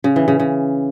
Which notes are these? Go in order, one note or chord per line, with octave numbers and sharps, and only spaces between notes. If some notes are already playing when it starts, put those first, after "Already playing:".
C#3
E3
C#3
C#3